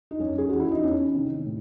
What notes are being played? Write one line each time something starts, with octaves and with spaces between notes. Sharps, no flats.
D#4
F#2 C#4
G#4
E3 F#4
E4
D#4
E2 C#4
C3 D#3
A2